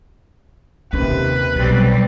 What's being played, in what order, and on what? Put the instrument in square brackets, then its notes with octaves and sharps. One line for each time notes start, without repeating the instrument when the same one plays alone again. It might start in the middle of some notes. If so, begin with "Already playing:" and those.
[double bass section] D#2 C3 [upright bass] C#4 [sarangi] B4
[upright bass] B1 [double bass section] B2 [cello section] F#3 G3 C4